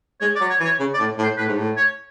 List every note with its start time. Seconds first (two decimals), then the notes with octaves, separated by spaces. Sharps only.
0.21 G#3 C#5
0.35 D5
0.41 F#3
0.50 C#5
0.60 E3
0.65 C#5
0.80 C#3
0.94 D5
0.99 A2
1.18 A2
1.23 C5
1.37 A2 B4
1.48 G#2
1.57 A2
1.77 C#5